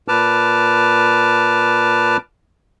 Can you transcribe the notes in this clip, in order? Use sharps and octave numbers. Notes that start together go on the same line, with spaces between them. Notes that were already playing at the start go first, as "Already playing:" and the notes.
A#2 B4 A5 D6 F6